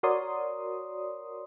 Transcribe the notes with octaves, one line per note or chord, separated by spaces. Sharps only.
F#4 A#4 C#5 D5 C6 D#6